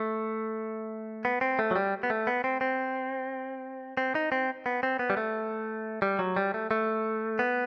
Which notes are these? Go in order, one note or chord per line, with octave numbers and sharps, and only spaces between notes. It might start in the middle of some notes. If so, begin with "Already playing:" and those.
Already playing: A3
B3
C4
A3
F#3
G3
B3
A3
B3
C4
C4
C4
D#4
C4
B3
C4
B3
G3
A3
G3
F#3
G3
A3
A3
B3